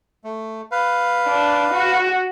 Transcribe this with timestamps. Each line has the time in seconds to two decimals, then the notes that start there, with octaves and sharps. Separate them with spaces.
0.24 A3
0.71 B4 F5
1.27 D4
1.74 F#4